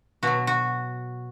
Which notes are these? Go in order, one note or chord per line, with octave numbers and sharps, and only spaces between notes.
B2 F#3 F#4
F#4